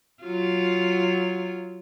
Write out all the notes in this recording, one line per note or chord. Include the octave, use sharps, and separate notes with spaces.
F#3 F4